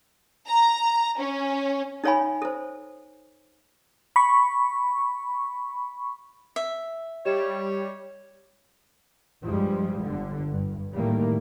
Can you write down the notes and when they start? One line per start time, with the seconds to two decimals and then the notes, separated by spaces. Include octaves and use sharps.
0.48 A#5
1.18 C#4
2.04 D#4 A4 C#5 F5 G#5 B5
2.42 A4 C5
4.16 B5 C#6
6.56 E5
7.26 G3 G4 C#5 D#5 E7
9.44 G2 F3 G3 G#3
10.01 G1 D3
10.51 G2
10.93 A2 D#3 G3 A3 A#3